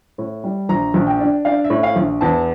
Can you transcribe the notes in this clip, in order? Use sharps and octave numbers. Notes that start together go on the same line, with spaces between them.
A2
G3
A#1 A#5
A#1
G5
D4
D4 F5
E5
A2
F5
A#1
E2 A5